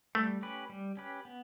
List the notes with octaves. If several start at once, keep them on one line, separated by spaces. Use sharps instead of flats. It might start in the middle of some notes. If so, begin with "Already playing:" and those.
G3 A3
C#4 G4 B4
G3
C#4 G4 B4
B3